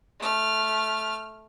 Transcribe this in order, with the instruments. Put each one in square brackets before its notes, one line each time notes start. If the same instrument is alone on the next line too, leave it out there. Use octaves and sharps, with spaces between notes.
[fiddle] A3 F6